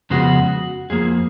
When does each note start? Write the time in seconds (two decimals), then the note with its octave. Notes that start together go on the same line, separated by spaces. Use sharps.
0.10 F2 C#3 G#3 B3 F#4
0.90 F2 F3 A#3 G#4